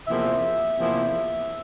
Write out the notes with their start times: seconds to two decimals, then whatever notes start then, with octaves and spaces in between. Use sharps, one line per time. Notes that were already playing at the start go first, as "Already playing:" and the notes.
0.08 E2 C3 F3 A#3 E4 E5
0.78 E2 C3 F3 A#3 E4